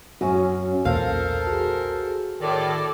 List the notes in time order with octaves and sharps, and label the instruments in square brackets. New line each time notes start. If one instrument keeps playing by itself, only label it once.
[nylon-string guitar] F#2 C#4 [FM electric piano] F#4
[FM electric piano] B1 E2 A#2 [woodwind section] A4 A#4 C5 [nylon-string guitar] F5
[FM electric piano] F#4 G#4
[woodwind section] A2 D#3 [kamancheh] A4 D5